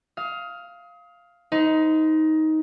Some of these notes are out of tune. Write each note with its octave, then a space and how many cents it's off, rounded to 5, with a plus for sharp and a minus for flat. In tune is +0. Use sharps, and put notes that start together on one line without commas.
F5 +0 D#6 +30
D#4 +15 C5 -25